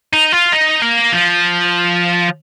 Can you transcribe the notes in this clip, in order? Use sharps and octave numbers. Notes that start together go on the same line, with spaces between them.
D#4
F4
D#4
A#3
F3